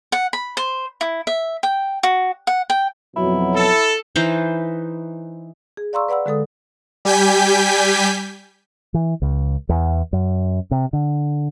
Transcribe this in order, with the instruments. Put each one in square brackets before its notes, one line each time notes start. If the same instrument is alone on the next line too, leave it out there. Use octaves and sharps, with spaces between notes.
[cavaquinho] F#5
B5
C5
E4
E5
G5
F#4
F#5
G5
[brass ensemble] F2 B2 F#3 [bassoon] E4
[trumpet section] A4
[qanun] E3 D#4 B4 C5
[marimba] G#4
D5 F5 A#5 C6 C#6 E6
B4 D5 F#5 B5 E6
D3 G#3 A4 D#6
[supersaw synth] G3 G4 G#5 G6 B6
[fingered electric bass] E3
C#2
E2
F#2
C3
D3